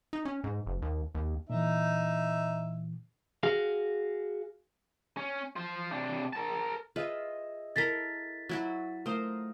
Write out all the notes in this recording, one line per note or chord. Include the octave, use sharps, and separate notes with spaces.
D#4
C#4
G#2
F#1
D#2
D#2
A#2 E3 D#4 E5
F#4 G#4 F5
C#4
F4 C5
C3 D4
A#4 A5
F4 G#4 B4 D#5 E5
E4 A4 A#4 A6 B6
F#3 E4 F#4
A3 F4 A#4 C5 D#6